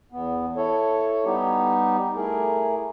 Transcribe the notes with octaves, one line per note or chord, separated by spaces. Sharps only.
E2 B3
E4 A4 C#5
G3 B3 D#4 G4
A3 E4 G#4 A#4